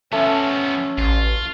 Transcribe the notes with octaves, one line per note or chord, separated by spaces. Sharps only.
F3 A3 B3 C#4
A1 F4